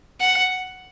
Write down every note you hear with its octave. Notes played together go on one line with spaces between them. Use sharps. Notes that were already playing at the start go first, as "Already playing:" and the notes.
F#5